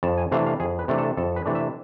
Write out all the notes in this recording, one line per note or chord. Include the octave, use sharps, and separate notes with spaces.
F2 A5
G#5
C3 E3 A3 D4 F5
F5
F2 G#4
B4
C3 E3 A3 D4
A4
F2 A4
B4
C3 E3 A3 D4
E5